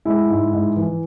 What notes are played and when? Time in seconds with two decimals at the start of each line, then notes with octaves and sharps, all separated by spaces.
0.05 G#3 E4
0.30 G#2
0.53 G#2
0.77 E3